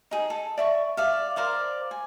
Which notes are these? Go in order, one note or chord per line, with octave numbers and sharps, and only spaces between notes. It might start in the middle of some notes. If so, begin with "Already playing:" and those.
D#4 G#4
A4
D5 E5 C#6
D5 E5 F5
A#4 C5 D5 F5
G#5